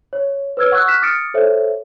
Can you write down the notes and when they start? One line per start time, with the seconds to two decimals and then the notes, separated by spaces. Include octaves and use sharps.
0.13 C#5
0.57 B4 C#5 E6 F6 G#6
0.72 F#5 C#6 D#6 E6 F#6
0.88 F6 F#6 B6 E7
1.02 D6 D#6 F6 A6 C#7 D7
1.34 A4 C5 C#5 E5